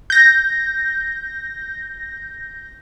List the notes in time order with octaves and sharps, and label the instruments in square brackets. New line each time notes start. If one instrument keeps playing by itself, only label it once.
[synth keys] G6 A#6